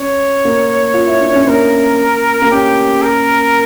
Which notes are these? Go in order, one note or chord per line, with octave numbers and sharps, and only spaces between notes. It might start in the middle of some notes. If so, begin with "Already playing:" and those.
Already playing: C#4 C#5
A#3
F4
E4
D4
C#4
A#3 A#4
A#3
C#4 G4
A#4